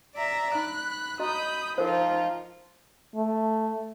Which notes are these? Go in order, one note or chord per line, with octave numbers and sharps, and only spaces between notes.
D5 E5 A#5
D#4 B5 F#6
F#4 D#5 A#5 B5 D#6 G6
F3 D#4 F4 A#4 C5
A3